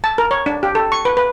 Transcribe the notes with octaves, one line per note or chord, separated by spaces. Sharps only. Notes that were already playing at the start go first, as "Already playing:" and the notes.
A5
A#4
C#5
D4
G4
A4
C#6
B4
B4